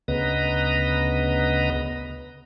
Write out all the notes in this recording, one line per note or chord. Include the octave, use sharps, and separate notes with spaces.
D2 C#3 B3 B4 D#5 A#5